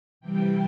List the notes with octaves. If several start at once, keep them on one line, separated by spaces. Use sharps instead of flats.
C3 E3 G3 G5